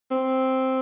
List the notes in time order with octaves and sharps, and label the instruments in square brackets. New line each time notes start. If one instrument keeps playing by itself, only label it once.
[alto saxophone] C4